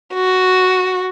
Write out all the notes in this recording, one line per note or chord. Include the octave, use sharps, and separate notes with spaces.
F#4